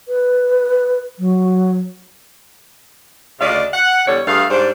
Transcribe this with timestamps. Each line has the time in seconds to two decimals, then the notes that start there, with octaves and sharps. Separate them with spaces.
0.08 B4
1.19 F#3
3.40 D2 C#3 D4 D5 D#5 F5
3.72 F#5
4.07 E2 D3 G3 A4 C#5
4.27 G2 A3 G#4 F5
4.50 G#2 G3 D4 C5